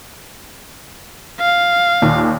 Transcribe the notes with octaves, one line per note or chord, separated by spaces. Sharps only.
F5
D#2 A#2